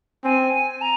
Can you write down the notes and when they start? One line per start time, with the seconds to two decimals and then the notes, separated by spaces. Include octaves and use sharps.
0.24 C4 G#5
0.53 G#5
0.82 A#5